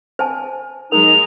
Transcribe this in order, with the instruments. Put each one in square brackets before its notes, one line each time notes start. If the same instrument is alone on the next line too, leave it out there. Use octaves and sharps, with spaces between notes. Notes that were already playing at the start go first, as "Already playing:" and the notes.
[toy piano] C5 G#5 A5
[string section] F#3 G#3 [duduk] D#4 [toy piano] A#4 [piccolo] F7